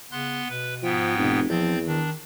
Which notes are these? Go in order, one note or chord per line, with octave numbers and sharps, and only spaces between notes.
C#3 B3 C6 F#6
B2 B4
G#2 F3 B3 G5
F1 B2
E2 F3 C4 G6 A6
D#3 D4